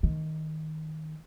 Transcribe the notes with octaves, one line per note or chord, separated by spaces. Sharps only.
D#3